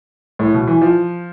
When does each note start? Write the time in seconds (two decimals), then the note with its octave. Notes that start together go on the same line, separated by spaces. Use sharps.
0.39 A2
0.54 B2
0.67 E3
0.82 F3